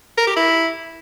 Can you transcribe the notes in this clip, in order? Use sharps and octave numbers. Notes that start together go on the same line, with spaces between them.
A#4
G4
E4